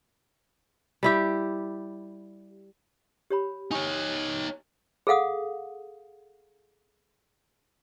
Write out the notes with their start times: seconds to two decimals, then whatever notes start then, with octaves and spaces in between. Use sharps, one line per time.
1.03 G3 E4 G4
3.30 G4 C#5 B5
3.71 D#4 C#5 G#5 C#6
5.07 G#4 A4 F5 F#5 D#6